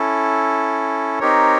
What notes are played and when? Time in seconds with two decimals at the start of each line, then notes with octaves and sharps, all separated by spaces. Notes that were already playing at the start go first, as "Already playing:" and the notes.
Already playing: C#4 E4 A4
1.20 C4 D#4 G4 A#4 C#5